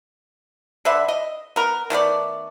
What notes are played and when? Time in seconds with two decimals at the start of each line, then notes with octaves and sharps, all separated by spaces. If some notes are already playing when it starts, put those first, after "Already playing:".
0.85 D3 B4 E5
1.08 D#5
1.56 B3 A#4
1.90 D#3 A3 B3 D5